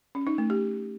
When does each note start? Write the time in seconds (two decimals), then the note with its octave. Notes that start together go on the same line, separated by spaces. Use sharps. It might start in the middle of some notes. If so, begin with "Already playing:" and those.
0.15 C#4
0.27 D#4
0.38 A3
0.50 G4